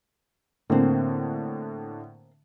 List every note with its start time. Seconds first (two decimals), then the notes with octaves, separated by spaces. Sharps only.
0.70 A2 D3 A#3 C4